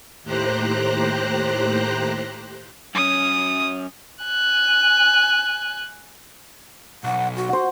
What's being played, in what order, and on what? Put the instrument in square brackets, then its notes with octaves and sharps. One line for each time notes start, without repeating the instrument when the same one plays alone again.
[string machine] D#2 A2 G4 C5 A#5 F#6
[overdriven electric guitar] F#2 C#4 [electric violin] D#6
[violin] G#5 F#6
[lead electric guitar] B1 [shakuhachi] F#5
[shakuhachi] F#4
[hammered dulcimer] C5 F#5